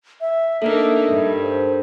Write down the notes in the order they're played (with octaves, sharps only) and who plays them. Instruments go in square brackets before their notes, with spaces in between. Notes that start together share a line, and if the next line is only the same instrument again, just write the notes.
[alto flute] E5
[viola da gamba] A#3 D4 D#4 [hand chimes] A4 A#4 [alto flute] E5
[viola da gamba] G2
[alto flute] C5